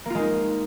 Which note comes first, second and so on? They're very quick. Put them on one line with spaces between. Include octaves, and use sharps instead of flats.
A#3 F4 G#3 D#4